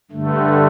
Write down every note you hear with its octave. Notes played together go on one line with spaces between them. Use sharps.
G2 D3 A3